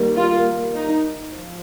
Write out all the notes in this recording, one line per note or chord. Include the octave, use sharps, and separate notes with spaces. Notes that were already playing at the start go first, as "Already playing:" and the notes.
Already playing: D#3 G3 A#3
F4
D#4
F3